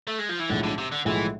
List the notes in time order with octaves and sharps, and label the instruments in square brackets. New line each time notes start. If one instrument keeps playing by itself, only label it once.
[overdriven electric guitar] A3
G#3
F3
E3
[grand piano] B1 A2 F3 G#3 [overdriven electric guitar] D3
[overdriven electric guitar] D3
C3
D3
[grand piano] B1 A2 F3 G#3 [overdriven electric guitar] E3